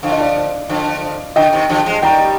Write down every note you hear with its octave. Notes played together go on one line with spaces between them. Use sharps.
D3 F3 F5
D#5
D5 F5
D3 F3
D3 D#5 G5
C3 D#3
D3 F3
F3 G#3
D#3 G3 G5 A#5